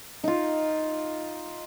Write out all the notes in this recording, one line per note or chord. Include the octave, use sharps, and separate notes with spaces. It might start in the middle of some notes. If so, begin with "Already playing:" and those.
D#4 F4